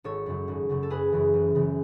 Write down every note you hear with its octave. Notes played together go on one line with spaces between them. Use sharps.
G#1 A4 C#5
F#2 C#3 F#3
G#1
F#2 C#3 F#3
A4
F#1 G#4 B4
F#2 C#3 E3
F#1
F#2 C#3 E3